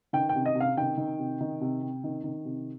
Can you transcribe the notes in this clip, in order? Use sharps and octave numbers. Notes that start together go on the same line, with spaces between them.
D#3 G5
G5
C3
D#5
C3
F5
D#3 G5
D#3
C3
D#3
C3
C3
D#3
D#3
C3